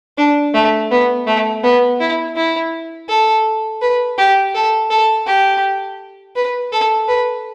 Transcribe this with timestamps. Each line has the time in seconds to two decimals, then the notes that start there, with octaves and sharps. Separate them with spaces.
0.18 D4
0.55 A3
0.92 B3
1.27 A3
1.64 B3
2.00 E4
2.36 E4
3.09 A4
3.82 B4
4.18 G4
4.55 A4
4.91 A4
5.27 G4
6.36 B4
6.72 A4
7.08 B4